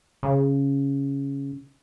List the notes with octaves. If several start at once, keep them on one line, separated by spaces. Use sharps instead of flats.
C#3